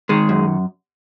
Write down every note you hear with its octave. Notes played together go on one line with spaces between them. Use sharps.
D#3 G#3 G#4
F#2